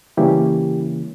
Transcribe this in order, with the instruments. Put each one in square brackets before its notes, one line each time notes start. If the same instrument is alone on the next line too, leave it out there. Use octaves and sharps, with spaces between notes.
[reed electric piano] C#3 E3 G3 A#3 C#4 E4 G4